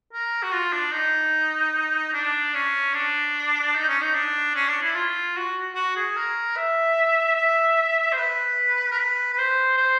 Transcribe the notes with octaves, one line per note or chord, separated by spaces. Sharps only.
A#4
F#4
F4
D4
D#4
D4
C#4
D4
D#4
C#4
D#4
D4
C#4
D4
E4
F4
F#4
F#4
G#4
A#4
E5
E5
C5
B4
A#4
B4
B4
C5
C5